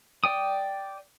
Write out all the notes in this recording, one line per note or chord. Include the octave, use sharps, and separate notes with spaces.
D5 G5 D#6